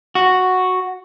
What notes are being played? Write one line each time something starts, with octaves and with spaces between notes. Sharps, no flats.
F#4